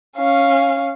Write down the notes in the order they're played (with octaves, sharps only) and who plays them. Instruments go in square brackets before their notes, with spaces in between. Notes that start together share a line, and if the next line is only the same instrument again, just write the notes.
[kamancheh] C#4 F5